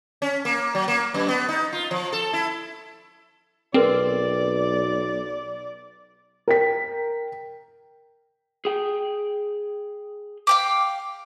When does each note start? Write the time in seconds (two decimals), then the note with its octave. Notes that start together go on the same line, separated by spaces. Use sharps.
0.22 C#4
0.45 A#3
0.75 F#3
0.88 A#3
1.14 F#2
1.29 B3
1.49 D#4
1.73 F4
1.91 F3
2.12 A4
2.33 E4
3.74 B1 C4 G#4 A#4 B4 D5
6.48 A#4 G5 B6
8.65 G#4 G5
10.47 F5 G5 D6